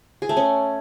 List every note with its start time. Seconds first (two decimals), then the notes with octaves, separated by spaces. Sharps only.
0.22 G#4
0.29 A3
0.37 C#4